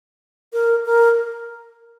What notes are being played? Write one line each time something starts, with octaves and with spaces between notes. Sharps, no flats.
A#4
A#4